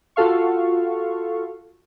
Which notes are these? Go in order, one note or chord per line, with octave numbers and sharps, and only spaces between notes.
F4 F#4 A4 F5 C#6